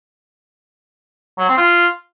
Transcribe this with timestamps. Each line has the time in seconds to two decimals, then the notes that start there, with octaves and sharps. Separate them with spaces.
1.38 F#3
1.48 C4
1.57 F4